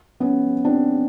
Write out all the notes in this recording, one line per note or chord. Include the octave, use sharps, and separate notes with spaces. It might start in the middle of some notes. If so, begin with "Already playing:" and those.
B3 C#4
C4 D4